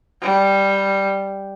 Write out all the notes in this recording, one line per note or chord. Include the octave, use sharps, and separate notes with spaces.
G3